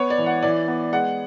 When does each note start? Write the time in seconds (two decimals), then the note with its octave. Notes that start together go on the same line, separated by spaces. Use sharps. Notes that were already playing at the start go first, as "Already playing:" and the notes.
Already playing: B3 C#5
0.10 D5
0.18 E3
0.26 F#5
0.43 E3 D5
0.68 B3
0.93 G#3 F#5